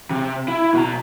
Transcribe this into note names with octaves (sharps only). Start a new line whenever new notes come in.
C3
E4
B2 A#5